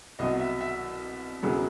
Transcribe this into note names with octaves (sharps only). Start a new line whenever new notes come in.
C2 B2 F#3 D#5
E5
E5
E1 E2 C#3 F#3